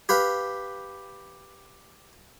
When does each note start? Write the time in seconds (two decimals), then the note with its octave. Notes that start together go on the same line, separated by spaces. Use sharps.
0.09 G4 B4 F5